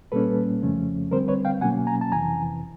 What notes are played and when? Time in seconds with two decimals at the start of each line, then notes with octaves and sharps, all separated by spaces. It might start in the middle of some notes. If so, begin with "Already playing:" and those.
0.12 A#2 G3 A#3 C#4 A4 B4
0.62 F2 C#3 F3 A3 C#4
1.11 D3 G3 C4 A#4 C5
1.28 B4 C#5
1.45 F5 G5
1.61 B2 F#3 A#3 C#4 F#5 G#5
1.87 G#5 A#5
2.01 A5
2.12 F2 C3 E3 G#5 A#5